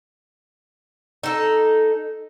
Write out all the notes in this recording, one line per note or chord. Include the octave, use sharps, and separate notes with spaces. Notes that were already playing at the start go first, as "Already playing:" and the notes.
D#4 A4